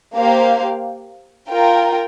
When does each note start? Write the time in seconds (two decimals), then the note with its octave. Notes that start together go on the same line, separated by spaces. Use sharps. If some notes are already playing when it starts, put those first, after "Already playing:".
0.13 A#3 G4 C5 F5
1.48 F4 A#4 G5